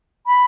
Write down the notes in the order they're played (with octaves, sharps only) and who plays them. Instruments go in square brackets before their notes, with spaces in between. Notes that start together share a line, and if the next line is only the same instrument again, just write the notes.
[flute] B5